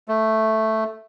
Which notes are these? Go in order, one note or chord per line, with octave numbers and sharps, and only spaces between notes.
A3